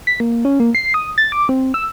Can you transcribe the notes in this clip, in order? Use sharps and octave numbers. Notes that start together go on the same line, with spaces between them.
B6
A#3
C#4
A#3
C7
D#6
A6
D6
C4
E6